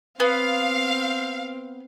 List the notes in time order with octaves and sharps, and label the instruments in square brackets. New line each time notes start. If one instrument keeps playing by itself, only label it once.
[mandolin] B3 [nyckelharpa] C4 [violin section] F5